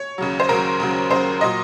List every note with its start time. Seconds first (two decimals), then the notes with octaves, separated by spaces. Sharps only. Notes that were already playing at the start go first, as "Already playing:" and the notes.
Already playing: C#5
0.18 D#2 C#3 F#3
0.40 C5
0.49 D#2 C#3 F#3 A#4
0.80 D#2 C#3 F#3
1.10 D#2 C#3 F#3 C5
1.41 A#2 F#3 D#5